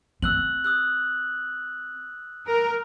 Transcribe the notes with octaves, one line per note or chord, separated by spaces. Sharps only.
C4 E6 F#6 F#7
D#6 E6 F#6
A#4